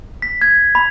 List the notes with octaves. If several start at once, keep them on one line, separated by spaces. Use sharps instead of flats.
B6
G#6
B5